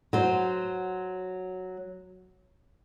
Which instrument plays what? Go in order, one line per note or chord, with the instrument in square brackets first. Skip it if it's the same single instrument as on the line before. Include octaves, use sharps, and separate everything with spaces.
[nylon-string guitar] F#3 C5